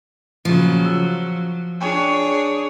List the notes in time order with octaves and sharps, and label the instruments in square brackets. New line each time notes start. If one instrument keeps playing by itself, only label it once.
[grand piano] A#2 C#3 [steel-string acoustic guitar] F3 [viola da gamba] F#3
[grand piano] E6
[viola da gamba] D4 G#4 C#5 [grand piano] G5 G#5 C#6